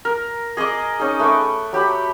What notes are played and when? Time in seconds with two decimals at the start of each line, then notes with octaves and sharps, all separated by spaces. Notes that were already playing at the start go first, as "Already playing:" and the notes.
0.05 A#4
0.57 G#4 D#5 A#5 D6
0.99 C#4 D#4 G#4
1.20 A3 B4 C#6 D6
1.73 F#3 G4 A5 B5